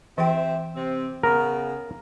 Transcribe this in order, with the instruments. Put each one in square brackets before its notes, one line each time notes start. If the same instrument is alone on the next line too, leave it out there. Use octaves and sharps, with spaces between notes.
[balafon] E3 G5 [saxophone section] C4 G4 E5
[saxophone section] C3 C4
[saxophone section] C#3 B3 [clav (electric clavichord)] A#4